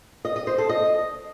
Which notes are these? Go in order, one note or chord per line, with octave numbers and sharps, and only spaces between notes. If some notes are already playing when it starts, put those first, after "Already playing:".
D#5
D#5
C5
A4
D#5